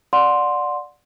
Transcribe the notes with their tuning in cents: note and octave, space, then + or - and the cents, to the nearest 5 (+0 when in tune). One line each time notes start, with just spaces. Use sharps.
D5 +0 F#5 -25 C6 +0